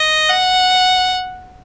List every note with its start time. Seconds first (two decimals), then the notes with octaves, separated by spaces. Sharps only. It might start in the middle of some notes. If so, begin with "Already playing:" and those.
Already playing: D#5
0.29 F#5